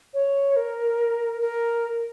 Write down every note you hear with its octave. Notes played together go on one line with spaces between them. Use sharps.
C#5
A#4
A#4